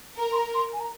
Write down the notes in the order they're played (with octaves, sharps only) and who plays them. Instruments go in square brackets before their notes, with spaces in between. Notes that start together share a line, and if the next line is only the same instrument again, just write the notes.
[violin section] A#4 [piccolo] A#5
[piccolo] C6
A#5
C6
G#5
A#5